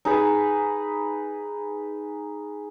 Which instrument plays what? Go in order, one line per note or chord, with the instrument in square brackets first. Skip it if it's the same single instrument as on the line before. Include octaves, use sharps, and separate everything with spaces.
[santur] D#4 G#4 B4